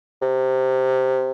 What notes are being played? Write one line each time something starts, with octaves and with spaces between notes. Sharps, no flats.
C3